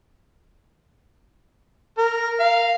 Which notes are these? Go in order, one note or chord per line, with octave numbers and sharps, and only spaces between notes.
A#4
F5